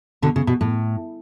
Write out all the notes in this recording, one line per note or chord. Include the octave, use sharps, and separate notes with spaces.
B2 D3
C#3
B2
A2